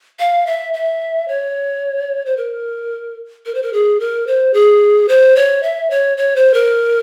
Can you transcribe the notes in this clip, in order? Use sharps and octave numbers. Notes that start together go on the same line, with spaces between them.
F5
E5
E5
C#5
C5
A#4
A#4
C5
A#4
G#4
A#4
C5
G#4
C5
C#5
E5
C#5
C#5
C5
A#4